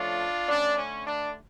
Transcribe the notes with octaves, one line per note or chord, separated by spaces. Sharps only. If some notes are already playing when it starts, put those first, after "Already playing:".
Already playing: F3 A3 C#4 D4 F4
D3 A3 C#4 D4
C#4
D4